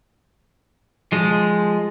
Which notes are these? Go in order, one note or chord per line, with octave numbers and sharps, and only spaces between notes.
F3 G#3